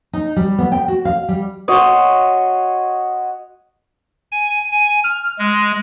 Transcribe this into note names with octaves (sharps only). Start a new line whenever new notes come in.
D#4
G3
B3
G5
F#4
F5
G3
F#4 C#5 D#5 C6
G#5
G#5
F6
G#3